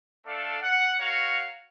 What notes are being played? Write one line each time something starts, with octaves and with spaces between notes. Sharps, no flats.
A3 D4 A4 D5 F5
F#5
F#4 A#4 C#5 F5